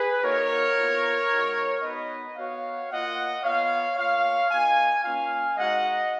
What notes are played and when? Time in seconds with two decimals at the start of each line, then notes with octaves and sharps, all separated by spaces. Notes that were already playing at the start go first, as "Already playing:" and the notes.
Already playing: G#4 B4
0.22 A#3 D#4 F#4 A#4 C#5
0.75 B3 F4
1.29 G#3 D#4 F#4
1.82 B3 D#4 F#4 B4 D#5
2.36 B3 F#4 C#5 F5
2.89 A#3 F4 D#5 F#5
3.42 B3 F4 C#5 F5
3.96 A#3 F4 C#5 F5
4.50 A#3 D#4 F#4 F5 G#5
5.03 A#3 C#4 F4 F5 G#5
5.56 G#3 D#4 F#4 D#5 F#5